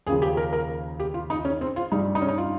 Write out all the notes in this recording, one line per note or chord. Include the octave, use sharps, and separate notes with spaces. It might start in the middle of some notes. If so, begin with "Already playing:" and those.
D#2 C#3 F3 G#4
G4
A#4
A#4
G4
F4
D#4
C#4
C4
F4
G2 G3 D#4
D#4
C#4
D#4
F4